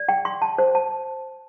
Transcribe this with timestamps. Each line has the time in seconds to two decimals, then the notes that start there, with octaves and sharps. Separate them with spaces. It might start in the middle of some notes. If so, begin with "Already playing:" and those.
Already playing: D5
0.09 G5
0.25 C6
0.42 A5
0.58 C5
0.75 A5